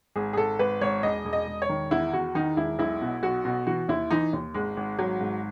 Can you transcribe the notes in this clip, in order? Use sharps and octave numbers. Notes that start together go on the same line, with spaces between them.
G#1 G#4
G#4
G#1 A4
G#1 B4
G#1 C#5
E1 D#5
E1
D#5
E1
C#5
D#3
E2 E4
E2 F#4
D#3 D#4
E1 E4
B1 E4
B2
B1 F#4
B2
E3 F#4
D#2 E4
E3 D#4
D#2
G#1 G#3
G#1
G#1 F#3
G#2